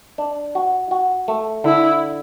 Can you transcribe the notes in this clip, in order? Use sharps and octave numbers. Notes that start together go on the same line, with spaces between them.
D4
F#4
F#4
A3
D3 E4